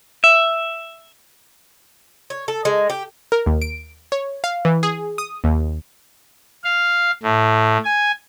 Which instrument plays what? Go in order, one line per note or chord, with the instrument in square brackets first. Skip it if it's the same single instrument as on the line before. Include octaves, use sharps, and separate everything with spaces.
[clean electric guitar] E5
[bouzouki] C#5
A4
G#3
G4
[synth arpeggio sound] A#4
D#2
D7
C#5
F5
E3
G#4
D#6
D#2
[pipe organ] F5
A2
G#5